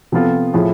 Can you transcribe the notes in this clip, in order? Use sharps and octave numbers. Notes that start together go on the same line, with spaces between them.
C3 F3 B3 F4 A4
A2 F3 A3 E4 G#4